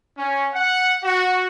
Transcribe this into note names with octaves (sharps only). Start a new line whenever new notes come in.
C#4
F#5
F#4